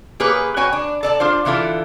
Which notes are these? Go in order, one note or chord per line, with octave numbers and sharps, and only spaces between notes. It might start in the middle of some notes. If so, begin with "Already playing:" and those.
A#3 G4 G#4 B4 C#5
F#4 C#5 G5 G#5
D4
A4 D5 A5
D4 F4 C5
D3 E3 E4 F4 A4